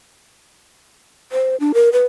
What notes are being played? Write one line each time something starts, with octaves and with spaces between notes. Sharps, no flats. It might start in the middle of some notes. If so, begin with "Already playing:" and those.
C5
D4
A#4
B4